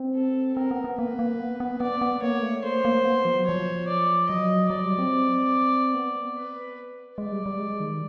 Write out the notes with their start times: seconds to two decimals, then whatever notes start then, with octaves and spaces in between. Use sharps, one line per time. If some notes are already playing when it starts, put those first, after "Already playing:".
Already playing: C4
0.15 A4
0.57 C4 A#4
0.71 B3
0.84 B3
0.98 A#3 B4
1.19 A#3
1.40 B3
1.60 B3
1.80 B3 D5
2.01 B3
2.22 A#3 C#5
2.43 A3
2.64 A#3 C5
2.85 A#3
3.05 B3
3.25 F3
3.37 F#3
3.46 F3 C#5
3.88 D5
4.29 F#3 D#5
4.70 F#3 D5
4.84 G3
4.99 C4
5.94 B3
6.36 B4
7.18 G#3 D5
7.32 G3
7.46 G3
7.60 G#3
7.80 D#3